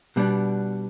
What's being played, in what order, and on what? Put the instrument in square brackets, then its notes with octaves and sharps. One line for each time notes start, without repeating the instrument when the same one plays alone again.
[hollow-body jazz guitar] B2 G3 B3 D4